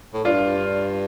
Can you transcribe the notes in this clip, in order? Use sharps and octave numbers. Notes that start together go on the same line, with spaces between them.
A2
G2 D4 F4